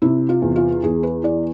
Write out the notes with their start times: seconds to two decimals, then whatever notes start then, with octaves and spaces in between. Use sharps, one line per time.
0.02 C3 E4
0.29 F4
0.42 E2
0.56 F4
0.83 E2 G#4
1.03 B4
1.23 E3 D5